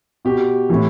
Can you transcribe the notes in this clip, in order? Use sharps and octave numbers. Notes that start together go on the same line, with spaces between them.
B2 G4
A2 E3